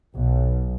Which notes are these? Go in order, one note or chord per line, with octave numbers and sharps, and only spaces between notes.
B1